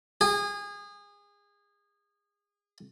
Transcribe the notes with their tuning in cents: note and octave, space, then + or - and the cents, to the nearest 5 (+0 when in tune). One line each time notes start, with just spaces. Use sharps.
G#4 -30